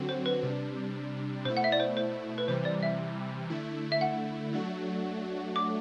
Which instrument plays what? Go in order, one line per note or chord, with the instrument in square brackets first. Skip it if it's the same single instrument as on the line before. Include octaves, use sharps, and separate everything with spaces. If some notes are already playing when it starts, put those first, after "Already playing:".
Already playing: [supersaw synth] D3 F#3 C4 F#4
[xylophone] C5
B4
[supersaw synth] C3 G3 D4
[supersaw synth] B2 A3 E4 [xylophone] C5
[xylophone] F#5
E5
D5
C5
C5
B4
[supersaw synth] C3 E3 G3 [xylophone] C5
[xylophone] D5
E5
[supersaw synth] D3 A3 E4
[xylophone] E5
F#5
[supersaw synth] F#3 A3 D4 F#4
[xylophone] D6